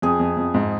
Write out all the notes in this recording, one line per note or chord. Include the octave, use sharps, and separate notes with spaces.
F2 G#4
F2
F2
G#2